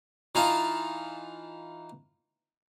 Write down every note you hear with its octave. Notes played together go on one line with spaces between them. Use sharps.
E3 D#4 F4 A5